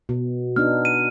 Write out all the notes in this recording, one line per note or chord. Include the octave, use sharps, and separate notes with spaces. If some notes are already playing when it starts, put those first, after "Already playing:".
B2
B3 D4 D#4 F6
D#7